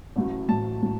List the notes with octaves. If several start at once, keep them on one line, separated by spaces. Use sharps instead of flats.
A1 A2 F#3
A1 A2 F#3 A5
A2 F#3